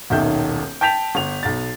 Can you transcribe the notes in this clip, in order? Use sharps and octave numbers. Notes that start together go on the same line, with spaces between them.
D#1 B1 D#3 E5 G6
G5 A5 G6 B6 F7
G1 F7
B1 A6